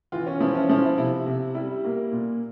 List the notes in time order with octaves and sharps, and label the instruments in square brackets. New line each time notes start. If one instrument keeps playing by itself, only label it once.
[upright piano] E3 F4
C#4
F3 E4
C#4
F3 E4
E4
C3 E4
C3
G3 E4
A#3
A#2